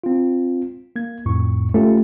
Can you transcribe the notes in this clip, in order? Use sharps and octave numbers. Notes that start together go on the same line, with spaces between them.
C4 F4
A#3 G#6
F2 A2 C#6
A3 C#4 F4 G4